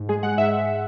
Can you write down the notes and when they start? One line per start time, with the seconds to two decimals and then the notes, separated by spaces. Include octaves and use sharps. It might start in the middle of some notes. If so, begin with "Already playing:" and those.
Already playing: G#2
0.09 G#3 G#4
0.23 G#3 F#5
0.38 G#2 E5
0.52 G#2